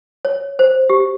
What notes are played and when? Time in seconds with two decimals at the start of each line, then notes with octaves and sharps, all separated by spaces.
0.25 C#5
0.59 C5
0.90 G4